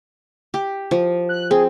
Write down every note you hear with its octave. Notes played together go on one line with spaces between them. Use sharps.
G4
F3
F#6
C4 G#4